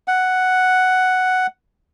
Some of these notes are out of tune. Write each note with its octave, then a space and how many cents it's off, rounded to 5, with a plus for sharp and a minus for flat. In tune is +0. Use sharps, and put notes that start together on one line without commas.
F#5 +5